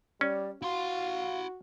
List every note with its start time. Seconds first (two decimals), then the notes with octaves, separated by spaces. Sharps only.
0.21 G3 C#4 D5
0.62 E4 F#4 F5 C6